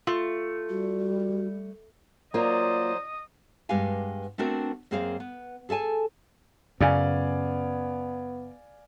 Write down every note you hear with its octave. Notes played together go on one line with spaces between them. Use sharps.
A3 F4
G3 F#4
F#3 A#3 F4 C5 D5 D#5
G2 G#3 B3 G4 F5 G#5
A3 B3 C4 D4 F#4 A#4
F#2 A#3 C4 G#4 C5 F5
B3
G#4 A4 E5 G#5 A5
F#2 C#3 B3 D5 F5 G#5